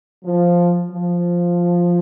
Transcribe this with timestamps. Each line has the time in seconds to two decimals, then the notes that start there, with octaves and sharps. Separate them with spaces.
0.25 F3
0.91 F3